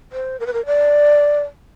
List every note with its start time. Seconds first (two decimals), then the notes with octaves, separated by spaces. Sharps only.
0.12 C5
0.40 A#4
0.46 B4
0.53 A#4
0.66 D5